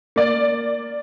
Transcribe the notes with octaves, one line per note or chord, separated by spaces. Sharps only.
A#3 D5